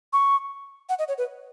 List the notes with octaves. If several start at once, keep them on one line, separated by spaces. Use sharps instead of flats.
C#6
F#5
D#5
C#5
B4